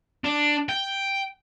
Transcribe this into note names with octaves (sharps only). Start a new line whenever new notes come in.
D4
G5